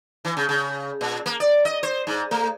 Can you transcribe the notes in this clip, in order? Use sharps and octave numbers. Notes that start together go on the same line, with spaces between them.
E3
C#3
C#3
A#2
A#3
D5
D#5
C5
G#2
A3